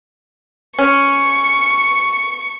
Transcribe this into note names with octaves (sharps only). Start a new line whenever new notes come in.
C#4 C#6